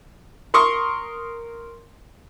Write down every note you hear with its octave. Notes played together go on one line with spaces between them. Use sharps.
A#4 C6 C#6 D#6